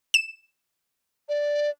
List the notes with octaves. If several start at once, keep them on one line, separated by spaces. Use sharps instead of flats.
E7
D5